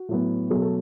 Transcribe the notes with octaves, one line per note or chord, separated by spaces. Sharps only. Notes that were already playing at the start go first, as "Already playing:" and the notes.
Already playing: F#4
A2 F#3 B3
B2 F#3 A3 G#4
A4